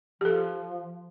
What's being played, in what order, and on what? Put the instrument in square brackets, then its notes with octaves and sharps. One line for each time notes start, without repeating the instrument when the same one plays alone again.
[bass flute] F3 [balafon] G4 A4